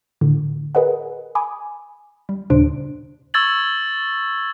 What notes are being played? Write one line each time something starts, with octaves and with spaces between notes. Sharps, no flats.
A2 D3
G#4 A#4 B4 D#5 F#5
G#5 B5 D6 D#6
G3
D#2 A#2 C#3 D4 C5 D7
C#6 E6 G#6 A6 F#7